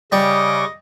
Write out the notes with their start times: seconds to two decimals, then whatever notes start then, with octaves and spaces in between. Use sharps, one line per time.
0.12 C#3 G3 D#5 C#6 D6